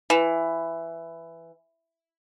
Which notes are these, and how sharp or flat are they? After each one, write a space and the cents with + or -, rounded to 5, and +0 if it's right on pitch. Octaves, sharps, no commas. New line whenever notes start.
E3 +10